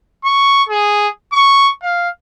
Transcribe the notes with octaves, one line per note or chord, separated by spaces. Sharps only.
C#6
G#4
C#6
F5